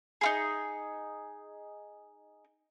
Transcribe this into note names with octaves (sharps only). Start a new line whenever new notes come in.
D#4 F4 G#4